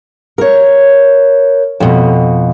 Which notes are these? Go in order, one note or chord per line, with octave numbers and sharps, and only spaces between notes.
A#4 C#5
F2 B2